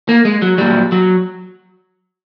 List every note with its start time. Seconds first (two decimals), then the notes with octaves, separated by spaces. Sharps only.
0.09 A#3
0.25 G#3
0.42 F#3
0.58 A#2 F#3 G3
0.92 F#3